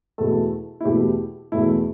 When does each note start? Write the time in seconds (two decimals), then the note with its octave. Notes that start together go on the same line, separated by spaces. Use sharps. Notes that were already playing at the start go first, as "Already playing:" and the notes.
0.18 E2 B2 A3 A4
0.81 E4
0.85 E2 B2 A3 G4
1.52 E2 B2 A3 E4